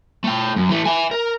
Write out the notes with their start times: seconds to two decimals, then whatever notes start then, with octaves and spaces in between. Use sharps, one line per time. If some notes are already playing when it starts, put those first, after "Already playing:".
0.24 A3 G5
0.56 F#2
0.69 E3 A3
0.86 E5 G#5
1.11 A#4